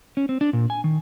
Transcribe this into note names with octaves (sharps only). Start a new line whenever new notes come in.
C#4
C4
D4
A#2
G#5
D#3